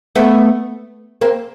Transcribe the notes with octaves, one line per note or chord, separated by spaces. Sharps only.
A3 B3
A#3 C4